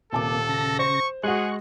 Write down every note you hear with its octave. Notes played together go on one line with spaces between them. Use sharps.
D#1 C3 A#3 A4 A5 D6
C#3 A#6
C5 C#6
G#3 F#4 G#4 C#6 F#6